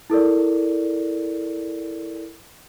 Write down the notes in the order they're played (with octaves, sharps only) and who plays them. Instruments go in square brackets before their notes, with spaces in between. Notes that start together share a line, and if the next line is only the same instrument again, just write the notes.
[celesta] E4 A4 A#4 D5